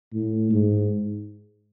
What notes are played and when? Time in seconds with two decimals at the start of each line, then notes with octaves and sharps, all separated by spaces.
0.14 A2
0.51 G#2